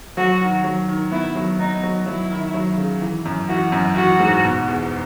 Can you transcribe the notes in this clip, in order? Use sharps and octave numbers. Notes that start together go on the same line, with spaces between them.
F#3 F#4
D#3
F#3
D#3
B3 E4
F#3
B3 D#4
F#3
F#3 E4
D#3
F#3
C#3
E3
F#2
E3 F#4
F#2
E3 F#4
G#2
B2
E2